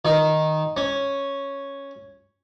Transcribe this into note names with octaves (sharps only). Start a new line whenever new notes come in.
D#3
C#4